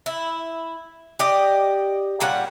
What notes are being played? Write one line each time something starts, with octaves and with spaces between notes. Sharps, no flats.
E4
G4 D5 D#5
A#2 G3 C#4 F#5